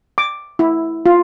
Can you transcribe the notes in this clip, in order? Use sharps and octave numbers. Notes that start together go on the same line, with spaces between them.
D6
E4
F4